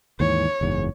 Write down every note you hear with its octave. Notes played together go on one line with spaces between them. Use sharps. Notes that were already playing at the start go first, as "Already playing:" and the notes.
D#2 G#2 E3 C#5
F#1 E2 G#2